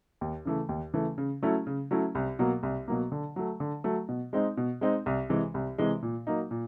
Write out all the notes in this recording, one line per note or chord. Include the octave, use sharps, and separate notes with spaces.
D#2
C#3 E3 A3
D#2
C#3 E3 A3
C#3
F#3 A3 C#4 E4
C#3
F#3 A3 C#4 E4
C2
B2 F#3 A#3
C2
B2 F#3 A#3
D3
F#3 A3
D3
F#3 A3
B2
G#3 C4 D#4
B2
G#3 C4 D#4
C2
C3 E3 G#3
C2
C3 E3 G#3
A#2
F#3 A#3 D#4
A#2